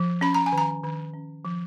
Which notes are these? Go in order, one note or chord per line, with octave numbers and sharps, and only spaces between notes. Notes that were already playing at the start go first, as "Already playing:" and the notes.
Already playing: F3
C#4 B5
A#5
G#5
D#3
A#5
D#3
C#4
F3